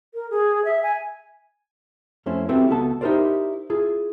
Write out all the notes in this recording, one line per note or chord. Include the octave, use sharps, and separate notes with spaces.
A#4
G#4
E5
G#5
F2 A3 C#4 E4 C5
C4 E4 F#4 G4 A4 B4
C#2 B3 F#4 A4 A5
D#4 E4 G4 A#4 C5 D5
E4 F4 G#4